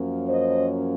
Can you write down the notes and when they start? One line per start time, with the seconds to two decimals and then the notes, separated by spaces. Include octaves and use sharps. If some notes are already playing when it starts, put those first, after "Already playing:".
Already playing: F#2 F3 A#3 C#4
0.27 C5 D#5